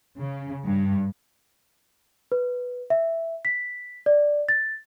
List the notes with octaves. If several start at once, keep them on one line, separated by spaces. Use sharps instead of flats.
C#3
G2
B4
E5
B6
D5
A6